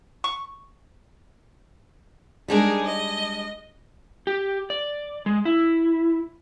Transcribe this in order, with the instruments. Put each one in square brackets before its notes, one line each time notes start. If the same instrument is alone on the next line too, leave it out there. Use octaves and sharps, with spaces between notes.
[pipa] C#6
[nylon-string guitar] G3 G#3 D4 [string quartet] D#4 G#4 A#4
[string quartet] D#5
[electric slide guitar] G4
D5
G#3
E4